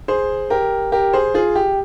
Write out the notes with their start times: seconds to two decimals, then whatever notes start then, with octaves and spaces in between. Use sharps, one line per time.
0.08 G#4 C5
0.50 G4 A#4
0.92 G4 A#4
1.13 G#4 C5
1.34 F4 G#4
1.55 G4